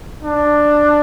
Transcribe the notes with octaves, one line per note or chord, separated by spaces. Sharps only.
D4